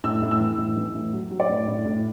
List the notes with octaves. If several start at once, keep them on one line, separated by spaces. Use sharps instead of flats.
A2 E6
A2
E6
E3
A2
E3
A2
F#3
F#3
D5
A2
A2
A2